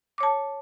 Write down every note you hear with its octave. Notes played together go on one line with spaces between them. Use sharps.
C#5 A5 D6